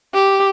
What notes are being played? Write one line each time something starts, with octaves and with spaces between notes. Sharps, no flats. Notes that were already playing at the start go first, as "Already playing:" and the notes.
G4